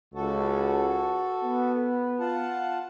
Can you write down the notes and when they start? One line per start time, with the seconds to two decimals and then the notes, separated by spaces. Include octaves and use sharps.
0.15 C#2 F#4 A4
1.44 B3
2.19 F4 F#5 A5